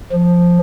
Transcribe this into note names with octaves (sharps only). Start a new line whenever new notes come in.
F3